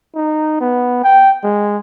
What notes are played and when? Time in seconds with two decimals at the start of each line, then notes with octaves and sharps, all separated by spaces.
0.15 D#4
0.61 B3
1.04 G5
1.43 G#3